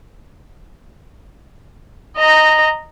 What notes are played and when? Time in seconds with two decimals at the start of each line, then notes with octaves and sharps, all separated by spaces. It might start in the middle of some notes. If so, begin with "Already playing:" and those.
2.17 D#5 A#5